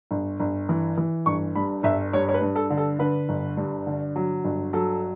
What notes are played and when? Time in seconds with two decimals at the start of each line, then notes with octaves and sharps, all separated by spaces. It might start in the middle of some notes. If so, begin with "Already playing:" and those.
0.11 G1
0.40 G1
0.69 E3
0.97 E3
1.26 G1 C#6
1.55 G2 B5
1.83 G1 E5
2.13 G2 C#5
2.29 C#5
2.34 B4
2.42 G2
2.56 A4
2.70 D3
2.77 A4
2.99 D3 B4
3.29 G1
3.57 G2
3.87 D3
4.16 F#3
4.44 G1
4.73 F#3 A4